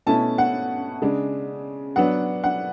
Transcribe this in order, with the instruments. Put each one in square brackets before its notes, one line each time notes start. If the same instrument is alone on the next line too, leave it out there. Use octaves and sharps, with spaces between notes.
[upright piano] B2 A3 C#4 E4 A5
F#5
C#3 G#3 D4
F#3 B3 D4 F#5
F#5